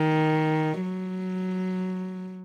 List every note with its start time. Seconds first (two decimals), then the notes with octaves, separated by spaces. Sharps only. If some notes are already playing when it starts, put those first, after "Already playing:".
Already playing: D#3
0.82 F#3